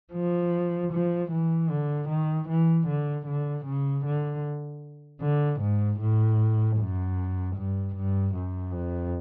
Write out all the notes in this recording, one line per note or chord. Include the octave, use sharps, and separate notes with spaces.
F3
F3
E3
D3
D#3
E3
D3
D3
C#3
D3
D3
G#2
A2
F#2
G2
G2
F#2
F2